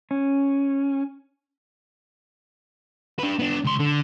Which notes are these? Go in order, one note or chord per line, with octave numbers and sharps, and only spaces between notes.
C#4
D4 B4
B3 D4
C#2 C6
D3